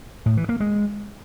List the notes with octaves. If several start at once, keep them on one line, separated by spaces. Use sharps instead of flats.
A2
E3
A#3
G#3